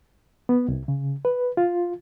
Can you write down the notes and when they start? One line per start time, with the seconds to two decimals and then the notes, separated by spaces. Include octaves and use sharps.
0.49 B3
0.68 C2
0.88 C#3
1.25 B4
1.57 F4